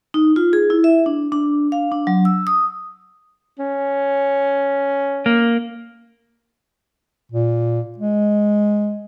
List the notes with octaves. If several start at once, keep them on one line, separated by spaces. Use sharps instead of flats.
D#4
F4
G#4
E4
E5
D4
D4
F5
D4
F#3
E6
D#6
C#4
A#3
A#2
G#3